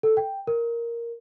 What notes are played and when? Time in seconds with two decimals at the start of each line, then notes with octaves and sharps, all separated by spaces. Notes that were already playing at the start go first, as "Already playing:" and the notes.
0.03 A4
0.17 G5
0.47 A#4